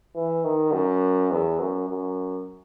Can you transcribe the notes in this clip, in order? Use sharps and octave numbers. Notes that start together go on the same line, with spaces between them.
E3
D#3
F#2
E2
F#2
F#2